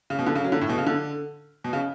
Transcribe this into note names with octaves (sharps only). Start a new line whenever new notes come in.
C#3
B2
D3
C#3
F#3
D3
A2
B2
C#3
D3
B2
C#3